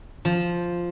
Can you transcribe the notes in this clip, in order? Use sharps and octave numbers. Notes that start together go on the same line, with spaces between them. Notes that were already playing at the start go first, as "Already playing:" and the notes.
F3